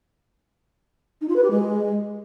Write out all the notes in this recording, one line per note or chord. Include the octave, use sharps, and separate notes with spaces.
D#4
F4
B4
G4
G#3